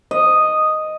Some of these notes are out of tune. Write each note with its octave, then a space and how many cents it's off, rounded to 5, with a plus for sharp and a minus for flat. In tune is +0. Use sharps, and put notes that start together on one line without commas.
D#5 -5